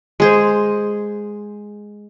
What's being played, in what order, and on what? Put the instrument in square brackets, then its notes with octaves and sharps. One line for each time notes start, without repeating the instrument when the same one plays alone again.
[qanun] G#3 G#4 C5